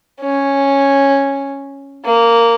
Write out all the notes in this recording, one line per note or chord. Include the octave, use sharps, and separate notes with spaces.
C#4
A#3